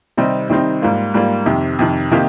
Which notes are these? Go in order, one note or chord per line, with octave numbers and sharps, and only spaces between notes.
C3 D#3 G3 C4 D#4
C3 D#3 G3 C4 D#4
G#2 G3 A#3 F4
G#2 G3 A#3 F4
F2 C3 D#3
F2 C3 D#3
C3 D#3 A#3 D#4 G4